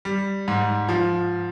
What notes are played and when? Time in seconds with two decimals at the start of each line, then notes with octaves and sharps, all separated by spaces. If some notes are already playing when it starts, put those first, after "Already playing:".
0.05 G3
0.48 G#2
0.89 F3